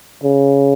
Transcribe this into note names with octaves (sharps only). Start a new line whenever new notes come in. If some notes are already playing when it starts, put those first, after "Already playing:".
C#3